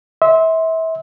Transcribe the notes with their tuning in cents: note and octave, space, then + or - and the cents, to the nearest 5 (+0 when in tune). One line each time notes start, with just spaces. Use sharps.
E5 -30 C6 +0